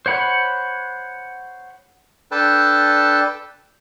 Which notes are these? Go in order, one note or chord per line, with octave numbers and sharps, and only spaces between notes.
C5 C#5 F#5 B5
D4 A4 B4 G5 A5